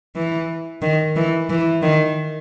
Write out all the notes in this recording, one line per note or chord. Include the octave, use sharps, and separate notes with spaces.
E3
D#3
E3
E3
D#3